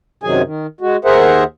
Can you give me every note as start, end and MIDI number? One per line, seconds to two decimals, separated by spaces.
0.23 0.42 42
0.23 0.42 48
0.23 0.42 51
0.23 0.42 54
0.23 0.42 68
0.23 0.42 80
0.44 0.67 51
0.81 0.97 56
0.81 0.97 66
1.05 1.44 39
1.05 1.44 68
1.05 1.44 70
1.05 1.44 72
1.05 1.44 76
1.05 1.44 78